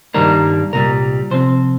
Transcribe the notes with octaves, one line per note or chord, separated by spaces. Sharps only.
G2 D#3 G3 A#3 D4 A#4
C2 A#2 G3 A#4
C3 F3 C4 C5